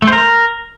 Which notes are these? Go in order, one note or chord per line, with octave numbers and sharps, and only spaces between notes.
A3
C5
A#4